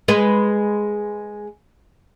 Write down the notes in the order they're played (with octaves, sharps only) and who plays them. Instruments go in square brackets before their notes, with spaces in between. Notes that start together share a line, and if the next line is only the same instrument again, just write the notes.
[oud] G#3 B4